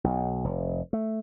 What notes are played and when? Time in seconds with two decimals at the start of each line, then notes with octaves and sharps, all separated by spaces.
0.04 B1
0.44 F1
0.93 A3